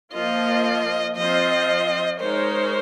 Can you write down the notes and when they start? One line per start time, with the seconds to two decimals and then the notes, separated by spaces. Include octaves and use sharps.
0.13 F3 A#3 F4 D#5
1.16 F3 C4 F4 C5 D#5
2.20 G#3 D#4 A#4 C5 C#5